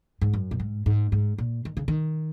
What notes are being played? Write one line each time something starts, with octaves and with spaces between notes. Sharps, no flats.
G#2
F#2
A#2
G#2
G#2
G#2
A#2
D#3
C#3
D#3